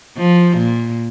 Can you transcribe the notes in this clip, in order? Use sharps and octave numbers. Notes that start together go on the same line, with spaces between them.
F3
A#2